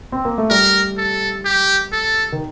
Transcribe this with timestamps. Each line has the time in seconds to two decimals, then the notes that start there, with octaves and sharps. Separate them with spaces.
0.12 C4
0.25 A#3
0.38 A3
0.50 G3 A#4
0.98 A4
1.45 G4
1.92 A4
2.32 D#3